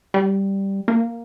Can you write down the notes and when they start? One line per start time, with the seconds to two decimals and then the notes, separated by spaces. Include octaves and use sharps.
0.14 G3
0.88 A#3